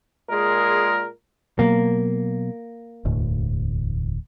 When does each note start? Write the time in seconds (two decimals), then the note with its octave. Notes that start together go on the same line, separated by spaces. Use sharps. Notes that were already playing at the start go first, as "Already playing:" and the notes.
0.29 A#2 G#3 G#4 A#4
1.59 B2 F#3 A#3 B3
3.05 E1 D2 A2